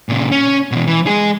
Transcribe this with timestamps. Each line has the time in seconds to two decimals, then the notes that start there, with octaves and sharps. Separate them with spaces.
0.09 A#2 C#3
0.32 C#4
0.72 B2 E3
0.87 E3
1.07 G#3 G#4